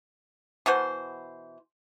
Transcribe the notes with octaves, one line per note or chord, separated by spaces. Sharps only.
B2 E3 F#4 C5